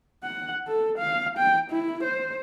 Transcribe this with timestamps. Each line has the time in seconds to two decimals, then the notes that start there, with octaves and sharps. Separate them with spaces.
0.23 F#5
0.67 A4
0.98 F5
1.38 G5
1.71 E4
2.03 C5